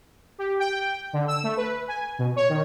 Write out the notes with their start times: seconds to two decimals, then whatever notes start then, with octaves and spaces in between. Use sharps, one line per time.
0.38 G4
0.59 G5
1.13 D3
1.28 E6
1.44 A3
1.57 B4
1.88 G#5
2.19 B2
2.36 C#5
2.49 D#3